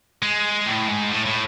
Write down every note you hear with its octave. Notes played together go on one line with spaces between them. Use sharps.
G#3
A2
G#2
A2
A2